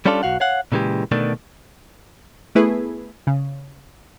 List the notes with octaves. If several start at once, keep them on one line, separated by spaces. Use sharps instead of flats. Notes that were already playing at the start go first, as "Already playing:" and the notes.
G3 C#4 D4 F4 A4 D5
B1 F#4 F5 F#5
C#5 F5 F#5
A#2 C#3 E3 G#3 G4
B2 D3 D#3 A3 D4
A3 B3 E4 G#4 B4
C#3